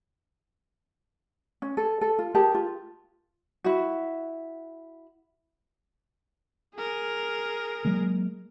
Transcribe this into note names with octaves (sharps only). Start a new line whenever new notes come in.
C#4
A4
A4
F4
G4 G#4 A#4 A5
F4
E4 F#4
G#4 A#4
F#3 G#3 A#3